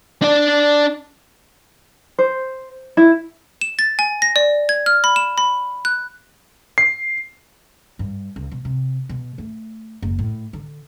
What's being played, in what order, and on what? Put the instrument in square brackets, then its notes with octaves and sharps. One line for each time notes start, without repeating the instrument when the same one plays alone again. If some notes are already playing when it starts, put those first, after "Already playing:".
[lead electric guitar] D4 D5
[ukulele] C5
E4
[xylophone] E7
A6
G#5
A#6
D5
G#6
F6
B5
E7
B5
F#6
[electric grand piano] C7
[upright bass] G2
C#2
B2
C3
B2
A3
F#1
A2
D3